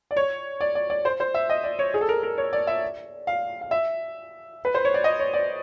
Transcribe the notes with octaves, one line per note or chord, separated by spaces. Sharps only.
D5
C#5
D5
D5
D5
C5
C5
E5
D#5
D5
C#5
G#4
A4
A#4
A#4
C#5
D5
E5
F5
F5
E5
B4
C5
C#5
D5
D#5
C#5
D5